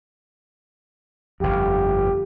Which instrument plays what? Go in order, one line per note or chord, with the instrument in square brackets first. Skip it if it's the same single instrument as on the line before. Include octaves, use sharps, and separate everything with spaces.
[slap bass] G1 F2 [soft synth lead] G4